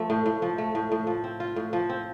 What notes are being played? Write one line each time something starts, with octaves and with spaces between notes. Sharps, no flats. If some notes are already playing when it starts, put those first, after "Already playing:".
Already playing: F3 A3
A2
A2
F3
A3
A2
A2
F3
C4
F4
A2
F3
C4